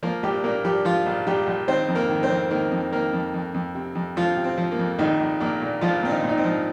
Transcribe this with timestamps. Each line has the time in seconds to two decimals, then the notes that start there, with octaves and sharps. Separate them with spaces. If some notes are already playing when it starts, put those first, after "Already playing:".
0.03 F3 A#3 A#4
0.23 A#1 G3 G4
0.44 A#2 A#3 A#4
0.64 F3 G3 G4
0.85 F3 F4
1.06 A#1
1.27 A#1 G3 G4
1.47 A#1
1.68 D#3 C4 C5
1.88 F2
1.95 A#3 A#4
2.09 D#3
2.23 C4 C5
2.30 F2
2.50 D#3 A#3 A#4
2.71 F2
2.92 D#3 A#3 A#4
3.13 F2
3.34 F2
3.54 F2
3.75 C3
3.95 F2
4.16 F2 F3 F4
4.37 C3
4.44 C4
4.58 F3
4.72 A#3
4.79 F2
4.99 A#1 D#3 D#4
5.20 A#1
5.40 A#1 A#3 A#4
5.62 A#2
5.81 A#1 F3 F4
6.03 A#2 C4
6.09 D#3 D#4
6.24 A#2
6.29 D#4
6.37 C4
6.44 F3